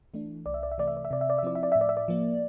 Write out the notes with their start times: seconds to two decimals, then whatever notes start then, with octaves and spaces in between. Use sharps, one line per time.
0.14 E3 A3 D4
0.46 C2 D5
0.54 E5
0.63 D5
0.71 E5
0.78 C3 E3 A3 D5
0.88 E5
0.97 D5
1.05 E5
1.11 C3 D5
1.21 E5
1.30 D5
1.38 E5
1.43 F3 C4 E4 D5
1.55 E5
1.63 D5
1.72 E5
1.75 A2
1.81 D5
1.89 E5
1.97 D5
2.08 F3 A#3